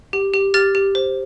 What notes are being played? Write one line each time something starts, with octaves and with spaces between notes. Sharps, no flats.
G4
G4
G4 F6 A6
G4
C5